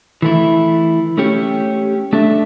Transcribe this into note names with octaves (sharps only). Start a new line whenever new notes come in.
E3 A3 E4
A3 C#4 G4 C#5
A3 D4 A4 E5